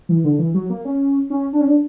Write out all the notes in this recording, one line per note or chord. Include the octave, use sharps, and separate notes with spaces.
E3
D3
E3
F#3
A#3
C#4
C#4
D4
C#4
D4